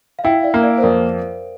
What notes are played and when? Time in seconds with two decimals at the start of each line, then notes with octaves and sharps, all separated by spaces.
0.19 F5
0.24 E4 E5 G5
0.43 D5 F5
0.54 A#3
0.63 D5 F5
0.78 C5
0.82 F2 A#4 D5